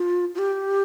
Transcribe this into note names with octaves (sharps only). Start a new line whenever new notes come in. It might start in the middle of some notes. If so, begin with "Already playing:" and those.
Already playing: F4
F4
G4